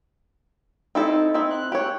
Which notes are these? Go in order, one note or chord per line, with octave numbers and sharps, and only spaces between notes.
C4 D#4 E4 A4
C4 D#4 E4
F#6
G4 C#5